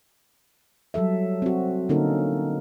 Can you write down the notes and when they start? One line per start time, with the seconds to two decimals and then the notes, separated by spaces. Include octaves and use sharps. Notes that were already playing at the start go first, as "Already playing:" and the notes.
0.94 F#3 G3 A4 E5
1.42 C4 F#4
1.89 D3 A#3 C#4 D#4 A4 A#4